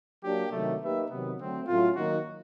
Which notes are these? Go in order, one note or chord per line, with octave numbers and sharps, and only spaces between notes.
F#3 A#3 D4 G4
C3 D#3 F#3 A3
A#3 D#4 G4 B4 E5
C3 D#3 F#3 B3
D3 F#3 A3 C4
A2 F#3 A3 C#4 F4
D#3 F#3 A#3 D#4 F#4